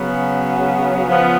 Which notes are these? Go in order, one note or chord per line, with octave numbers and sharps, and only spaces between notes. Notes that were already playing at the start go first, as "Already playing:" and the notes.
Already playing: C#3 F#3 B3
C#3 F3 B3